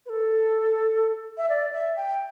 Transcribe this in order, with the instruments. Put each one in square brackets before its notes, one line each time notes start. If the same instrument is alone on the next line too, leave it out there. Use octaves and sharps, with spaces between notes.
[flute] B4
A4
E5
D5
E5
G5